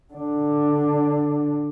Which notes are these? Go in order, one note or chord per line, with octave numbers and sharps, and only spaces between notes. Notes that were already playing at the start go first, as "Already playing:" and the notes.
D3 D4